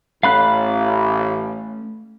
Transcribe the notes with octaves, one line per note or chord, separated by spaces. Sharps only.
A1 A3 C#4 F5 B5 F#6